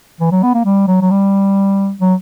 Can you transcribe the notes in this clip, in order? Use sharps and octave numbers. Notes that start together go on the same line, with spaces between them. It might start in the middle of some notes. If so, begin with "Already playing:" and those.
E3
F#3
B3
A#3
G3
F#3
F#3
G3
F#3